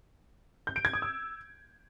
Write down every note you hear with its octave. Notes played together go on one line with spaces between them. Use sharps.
G6
D7
G#6
D#6
E6